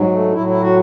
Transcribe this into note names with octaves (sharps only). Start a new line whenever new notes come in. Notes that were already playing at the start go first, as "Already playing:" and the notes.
Already playing: G#2 F#3
A3
A2 F#3 E4
E4
F#4